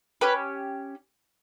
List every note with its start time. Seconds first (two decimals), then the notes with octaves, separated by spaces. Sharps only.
0.21 C#4 G4 B4